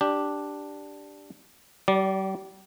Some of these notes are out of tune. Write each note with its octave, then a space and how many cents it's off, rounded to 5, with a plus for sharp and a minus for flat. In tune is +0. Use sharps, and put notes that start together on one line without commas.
D4 +0 G4 +0
G3 -35 D5 -5